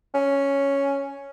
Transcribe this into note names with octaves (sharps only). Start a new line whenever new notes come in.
C#4